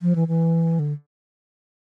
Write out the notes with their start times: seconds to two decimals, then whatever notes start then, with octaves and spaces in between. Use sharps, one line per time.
0.02 F3
0.15 E3
0.28 E3
0.79 D3